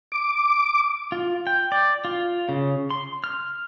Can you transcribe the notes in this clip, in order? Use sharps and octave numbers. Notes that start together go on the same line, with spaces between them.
D6
F4
G5
D5
F4
C#3
C6
F6